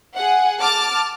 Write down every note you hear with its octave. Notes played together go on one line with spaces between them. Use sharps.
G#4 F#5
A5 D6 F6